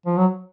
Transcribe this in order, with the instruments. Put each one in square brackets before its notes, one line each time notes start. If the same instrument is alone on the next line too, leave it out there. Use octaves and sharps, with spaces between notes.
[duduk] F3
F#3